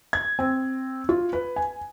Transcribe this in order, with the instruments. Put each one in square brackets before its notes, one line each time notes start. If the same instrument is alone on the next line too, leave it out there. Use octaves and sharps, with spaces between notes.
[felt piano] G#6
C4
F4
B4
G#5